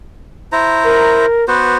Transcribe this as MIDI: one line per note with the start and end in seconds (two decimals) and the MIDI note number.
0.52 1.26 64
0.52 1.26 72
0.52 1.26 82
0.84 1.47 70
1.48 1.78 59
1.48 1.78 66
1.48 1.74 71
1.48 1.78 72